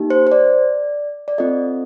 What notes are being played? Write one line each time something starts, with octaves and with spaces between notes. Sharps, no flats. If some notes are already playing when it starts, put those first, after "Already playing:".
Already playing: A#3 D#4 G4
C5
C5
D5
D5
C4 F4 A4 D#5